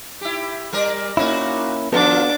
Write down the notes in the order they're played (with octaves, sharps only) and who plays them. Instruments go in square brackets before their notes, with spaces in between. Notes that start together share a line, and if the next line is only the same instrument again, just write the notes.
[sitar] E4 G4
G3 A#4 D5
[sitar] A#2 D#4 F#4 [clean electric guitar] A#3 C#4 E4
[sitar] D#3 F3 F4 [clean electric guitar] B3 F#4 A4 [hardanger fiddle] D4 D6